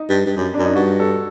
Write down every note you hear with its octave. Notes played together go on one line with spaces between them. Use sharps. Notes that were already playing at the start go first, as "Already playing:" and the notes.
Already playing: D#4
G2
G2
F#2
F#2 D4
D#4
G2 F#4
A4